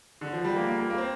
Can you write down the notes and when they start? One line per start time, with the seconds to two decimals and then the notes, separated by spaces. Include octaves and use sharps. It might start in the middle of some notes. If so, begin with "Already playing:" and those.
0.21 D3
0.33 F3
0.45 G3
0.56 A#3
0.67 A#3
0.78 A#3
0.90 A#3
0.98 C4